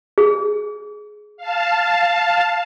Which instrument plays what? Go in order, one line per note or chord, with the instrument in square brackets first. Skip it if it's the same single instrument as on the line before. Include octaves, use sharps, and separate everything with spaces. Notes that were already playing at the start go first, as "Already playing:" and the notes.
[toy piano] G#4
[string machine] F5 A5